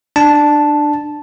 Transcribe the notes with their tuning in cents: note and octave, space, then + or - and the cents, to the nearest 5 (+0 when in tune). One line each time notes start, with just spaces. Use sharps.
D4 +20 A5 -5